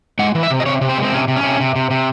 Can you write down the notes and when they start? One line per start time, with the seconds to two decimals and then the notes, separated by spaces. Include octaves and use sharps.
0.19 G#3 F#5
0.35 E3
0.43 E5
0.50 C3
0.60 D#5
0.66 C3 C#5
0.81 C3
0.89 C5
0.97 G#3
1.04 C4
1.12 C3 C#4
1.28 C3
1.36 C#4
1.43 C3
1.60 C3
1.76 C3
1.91 C3